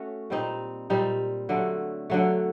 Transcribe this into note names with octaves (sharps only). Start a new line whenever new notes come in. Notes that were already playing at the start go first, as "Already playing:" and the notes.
Already playing: A3 C#4 F#4
A#2 G3 C4 D#4
A#2 G3 C4 D#4
D3 F#3 A3
D3 F#3 A3